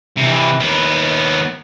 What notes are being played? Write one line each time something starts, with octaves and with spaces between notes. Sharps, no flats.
C3 E3
D#2 B3